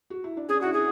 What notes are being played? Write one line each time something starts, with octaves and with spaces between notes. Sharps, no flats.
F#4
E4
D4
C#4 G#4
E4 F#4
D4
G#4